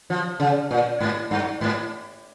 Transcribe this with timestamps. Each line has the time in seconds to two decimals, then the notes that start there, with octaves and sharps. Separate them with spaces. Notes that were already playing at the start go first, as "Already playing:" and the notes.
0.10 F3
0.40 C#3
0.71 A#2
1.00 G#2
1.31 G2
1.61 G#2